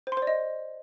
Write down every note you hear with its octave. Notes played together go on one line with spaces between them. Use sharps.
C5
C6
C5
D5
D#5